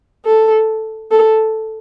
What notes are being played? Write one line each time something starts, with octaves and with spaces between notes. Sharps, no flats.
A4
A4